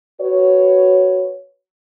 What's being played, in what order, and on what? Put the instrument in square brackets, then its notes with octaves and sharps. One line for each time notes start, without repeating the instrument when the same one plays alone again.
[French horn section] F#4 B4 C#5